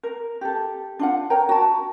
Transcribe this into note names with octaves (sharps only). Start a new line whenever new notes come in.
A#4
G4 A4
D4 F4 F#5
A#4 C#5 G5 A#5
F#4 A5